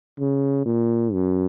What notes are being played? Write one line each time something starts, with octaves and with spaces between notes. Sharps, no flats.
C#3
A#2
F#2